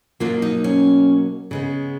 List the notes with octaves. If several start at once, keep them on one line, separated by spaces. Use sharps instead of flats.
B2 F#3 A#3 F4
D#4
C#4
C#3 G#3 B3